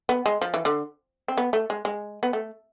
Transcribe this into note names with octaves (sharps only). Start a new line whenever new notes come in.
B3
G#3
F3
E3
D3
C4
B3
A3
G#3
G#3
B3
A3